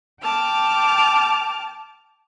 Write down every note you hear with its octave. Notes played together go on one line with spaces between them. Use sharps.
G5 A5 D6 F6